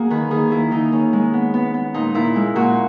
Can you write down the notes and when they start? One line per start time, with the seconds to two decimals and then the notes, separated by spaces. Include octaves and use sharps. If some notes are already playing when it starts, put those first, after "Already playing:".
Already playing: A#3 F#4 G#4
0.10 D#3 B4
0.31 D#3 G#4
0.51 A#3 E4
0.71 D#3 D#4
0.92 D#3 C#4
1.13 G#3
1.33 B3
1.54 B3
1.74 B3
1.94 A#2 D#4
2.14 A#2 E4
2.36 G#3
2.56 A#2 F#4